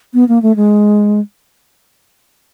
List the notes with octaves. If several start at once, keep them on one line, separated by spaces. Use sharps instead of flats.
B3
A#3
A3
G#3